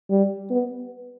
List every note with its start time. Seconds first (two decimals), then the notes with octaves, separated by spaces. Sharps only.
0.10 G3
0.51 B3